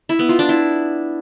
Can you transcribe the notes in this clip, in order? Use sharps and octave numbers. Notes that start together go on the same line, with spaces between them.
E4
B3
F4
D4
E4